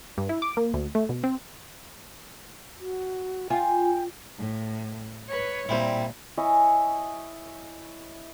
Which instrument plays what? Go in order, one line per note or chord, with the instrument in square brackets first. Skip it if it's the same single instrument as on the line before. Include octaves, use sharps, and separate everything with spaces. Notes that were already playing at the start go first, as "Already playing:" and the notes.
[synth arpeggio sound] G2
E4
D6
A#3
D2
A3
B2
C4
[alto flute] F#4
[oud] F4 [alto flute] G5 [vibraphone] G#5
[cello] A2
B4 C#5
[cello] A#2 [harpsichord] G3 C4 E4
[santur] E4 C#5 D#5 G#5